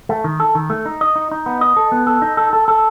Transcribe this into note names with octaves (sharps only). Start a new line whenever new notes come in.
A3
D#3
A4
D#3
A3
D#4
D#5
D#4
D#4
B3
D#5
A4
B3
A4
D#4
A4
A4
A4